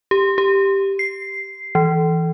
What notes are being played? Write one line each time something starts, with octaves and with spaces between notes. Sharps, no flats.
G4
G4
C7
E3